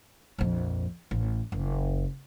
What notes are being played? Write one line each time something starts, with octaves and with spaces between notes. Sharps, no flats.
A#1 F2
A1
F#1